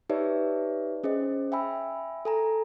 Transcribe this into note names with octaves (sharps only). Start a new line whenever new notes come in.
D#4 G4 B4 C#5 D5 E5
C#4 G#4 C5 D#5
E5 G5 G#5 B5 E6
A4 G#5 A#5